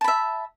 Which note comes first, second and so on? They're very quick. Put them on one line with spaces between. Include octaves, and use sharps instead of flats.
A5 B5 E5